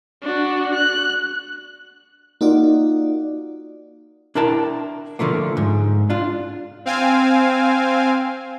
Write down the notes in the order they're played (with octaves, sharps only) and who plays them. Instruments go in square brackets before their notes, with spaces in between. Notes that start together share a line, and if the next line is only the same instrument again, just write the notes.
[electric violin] D4 F#4
F#6
[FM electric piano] A#3 D#4 F4 F#4 D5
[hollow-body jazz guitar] D4 E4 A#4 G5 A5
D3 F3 A3 A#3
G#2
D4 F4
[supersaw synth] C4 F5 G#5